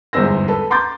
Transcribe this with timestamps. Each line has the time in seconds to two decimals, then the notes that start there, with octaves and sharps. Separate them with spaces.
0.13 G1 E2 G#2 C5 E6 A#6
0.48 A4 B4 A5
0.71 A#5 C6 D6 G6 A6